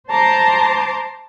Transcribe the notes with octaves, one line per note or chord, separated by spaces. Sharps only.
C5 A5 A#5 C6 D6